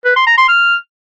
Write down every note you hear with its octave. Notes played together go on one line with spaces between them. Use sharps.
B4
C6
A#5
C6
F6